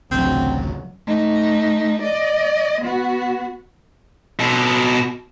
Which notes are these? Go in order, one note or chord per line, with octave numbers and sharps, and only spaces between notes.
D1 A1 D2 C#3 F#3 C4
A3 D#4
D5 D#5
B3 F#4
B2 A4